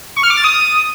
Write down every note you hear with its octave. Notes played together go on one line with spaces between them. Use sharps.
C#6
F6
D6
A6
D#6